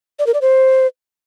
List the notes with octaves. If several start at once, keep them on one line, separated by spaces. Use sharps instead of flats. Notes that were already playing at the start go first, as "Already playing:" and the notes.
D5
A#4
D5
C5